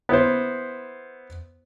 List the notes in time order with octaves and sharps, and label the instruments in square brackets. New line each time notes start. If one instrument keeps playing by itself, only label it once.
[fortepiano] B3 E4 C5